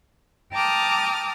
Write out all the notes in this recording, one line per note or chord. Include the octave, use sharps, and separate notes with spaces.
G5 A5 A#5 D6 D#6 F6